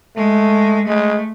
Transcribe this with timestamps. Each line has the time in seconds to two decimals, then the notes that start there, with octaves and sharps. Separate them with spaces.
0.16 G#3 A3
0.87 G#3 A3